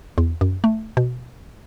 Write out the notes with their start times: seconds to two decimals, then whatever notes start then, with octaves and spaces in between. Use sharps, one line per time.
0.18 E2
0.41 F#2
0.64 A3
0.97 B2